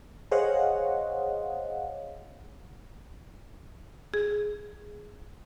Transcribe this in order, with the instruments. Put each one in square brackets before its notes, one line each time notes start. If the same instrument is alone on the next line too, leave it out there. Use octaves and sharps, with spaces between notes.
[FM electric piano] G#4 C5 C#5 D#5 F5 F#5
[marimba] G#4